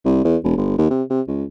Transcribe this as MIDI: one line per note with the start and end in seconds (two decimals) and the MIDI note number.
0.05 0.22 36
0.25 0.37 40
0.44 0.56 28
0.58 0.78 31
0.78 0.87 39
0.90 1.03 48
1.10 1.21 48
1.28 1.44 37